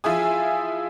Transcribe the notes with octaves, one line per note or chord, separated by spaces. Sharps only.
F3 E4 F4 G#4 G#5 D#6